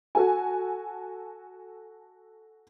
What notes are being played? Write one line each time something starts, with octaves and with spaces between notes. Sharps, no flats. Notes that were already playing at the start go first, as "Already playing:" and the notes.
F#4 A4 G#5